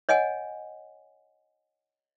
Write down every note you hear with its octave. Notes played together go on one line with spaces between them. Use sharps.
C#5 D#5 F#5 G#5